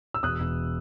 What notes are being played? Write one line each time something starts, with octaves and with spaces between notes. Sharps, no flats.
E6
E1 D#6 F#6
E1